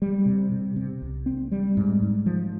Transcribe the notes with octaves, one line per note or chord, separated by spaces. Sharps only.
G3
C3
C3
C3
C2
C4
G3
G#2
G#2
F3